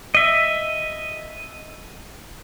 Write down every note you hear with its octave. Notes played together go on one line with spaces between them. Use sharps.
D#5 E5